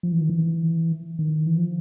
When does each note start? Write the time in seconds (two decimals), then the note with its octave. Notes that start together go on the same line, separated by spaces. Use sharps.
0.03 F3
0.12 E3
0.21 D#3
0.29 E3
1.19 D#3
1.46 E3
1.57 F3